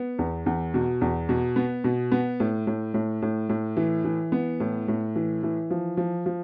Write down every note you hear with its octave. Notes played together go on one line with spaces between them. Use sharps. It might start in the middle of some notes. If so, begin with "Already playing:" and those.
Already playing: B3
E2
E2
B2
E2
B2
B3
B2
B3
A2
A2
A2
A2
A2
E3
E3
B3
A2
A2
E3
E3
F3
F3
F3